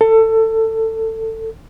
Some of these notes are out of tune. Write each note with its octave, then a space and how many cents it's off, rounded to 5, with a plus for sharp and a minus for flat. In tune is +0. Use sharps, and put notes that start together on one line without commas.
A4 +20